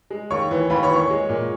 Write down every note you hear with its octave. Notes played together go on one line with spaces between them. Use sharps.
G#3
D#2 C#5 C#6
E3
D#2 B4 B5
C#5 C#6
E3
C#5 C#6
G#3
A#2